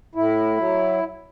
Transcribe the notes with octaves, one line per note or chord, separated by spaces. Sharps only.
A2 E4
F#3